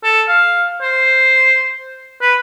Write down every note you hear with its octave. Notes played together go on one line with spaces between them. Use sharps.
A4
F5
C5
B4